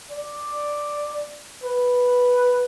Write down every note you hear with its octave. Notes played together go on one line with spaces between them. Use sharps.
D5
B4